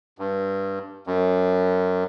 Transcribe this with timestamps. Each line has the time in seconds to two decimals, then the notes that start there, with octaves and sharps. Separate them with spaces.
0.18 G2
1.07 F#2